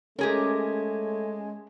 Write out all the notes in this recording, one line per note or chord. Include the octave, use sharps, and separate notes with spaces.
G#3 A3 C#4 G4 G#4 A#4